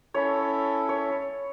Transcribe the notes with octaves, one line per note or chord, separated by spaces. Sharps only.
C#4 E4 A4 C#5 E5
C#5